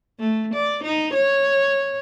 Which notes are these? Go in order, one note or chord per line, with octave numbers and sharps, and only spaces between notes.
A3
D5
D#4
C#5